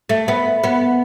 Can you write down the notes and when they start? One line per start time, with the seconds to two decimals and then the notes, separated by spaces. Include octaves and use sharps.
0.09 A3
0.28 B3
0.64 B3